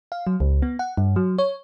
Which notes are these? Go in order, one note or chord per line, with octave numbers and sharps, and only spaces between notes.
F5
F#3
C#2
B3
F#5
G2
F#3
C#5